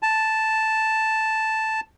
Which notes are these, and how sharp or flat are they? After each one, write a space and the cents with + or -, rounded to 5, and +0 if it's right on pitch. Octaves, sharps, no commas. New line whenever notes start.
A5 +0